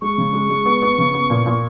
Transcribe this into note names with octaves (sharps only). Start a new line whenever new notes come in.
G#3 C#6
C#3
G#3
G#3
B3
B3
C#3
B3
A#2
A#2